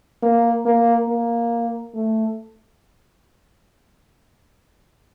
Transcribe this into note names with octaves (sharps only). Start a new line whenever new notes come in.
A#3
A#3
A#3
A3